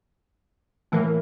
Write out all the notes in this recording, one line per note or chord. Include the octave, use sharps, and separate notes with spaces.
A2 E3 A#3